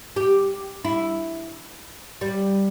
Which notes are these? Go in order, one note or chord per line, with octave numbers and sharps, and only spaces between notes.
G4
E4
G3